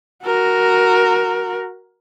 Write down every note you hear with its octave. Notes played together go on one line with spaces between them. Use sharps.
F#4 A#4